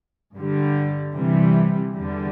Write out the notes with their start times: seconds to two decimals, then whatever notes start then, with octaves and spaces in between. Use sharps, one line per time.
0.36 G2 D3 G3
1.14 C3 E3 G3
1.94 E2 D3 G3